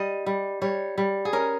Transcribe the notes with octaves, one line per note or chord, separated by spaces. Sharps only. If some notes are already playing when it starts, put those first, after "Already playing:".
Already playing: G3 D#5
G3
G3 C#5
G3
G#4
C#4 A#4